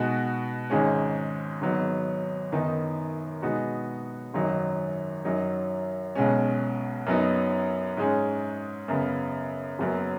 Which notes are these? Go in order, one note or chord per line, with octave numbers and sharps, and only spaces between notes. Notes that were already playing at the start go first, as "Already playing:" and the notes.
Already playing: B2 G#3 D#4 F#4
G#1 G#2 G#3 C#4
G#1 G#2 F#3 B3
F#2 D#3 B3 D#4
B2 G#3 B3 D#4 F#4
G#1 F#2 F#3 D#4
F#2 F#3 D#4
B1 B2 G#3 C#4
F#2 F#3 B3 D#4
G#2 G#3 C#4
F#2 C#3 B3
F#1 F#2 F#3 B3